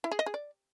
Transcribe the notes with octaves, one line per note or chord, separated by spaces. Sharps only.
E4
G#4
D#5
G#4
D5